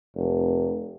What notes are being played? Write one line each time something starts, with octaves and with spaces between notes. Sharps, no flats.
F1